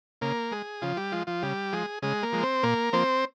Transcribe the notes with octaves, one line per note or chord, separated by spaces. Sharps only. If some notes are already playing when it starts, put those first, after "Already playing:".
C#3 A#3 A#4
G#3 G#4
C#3 F3 F4
G3 G4
F3 G#3 F4
F3 F4
C#3 G3 G4
F3 G#3 G#4
C#3 G#3 G#4
A#3 A#4
F3 G#3
C4 C5
A#2 A#3 A#4
F3 A#3 C4 C5